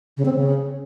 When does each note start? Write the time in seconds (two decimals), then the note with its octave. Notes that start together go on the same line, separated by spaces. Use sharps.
0.17 C#3
0.25 C4
0.33 C#3